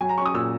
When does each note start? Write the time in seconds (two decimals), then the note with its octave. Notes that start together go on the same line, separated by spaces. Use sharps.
0.01 F#3 G#5
0.09 A#5
0.18 C#4 C#6
0.26 D#6
0.34 A#2 E6